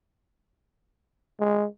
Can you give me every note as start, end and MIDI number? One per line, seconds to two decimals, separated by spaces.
1.40 1.67 56